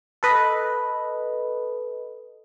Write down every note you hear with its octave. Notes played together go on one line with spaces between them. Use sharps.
A4 B4 D#5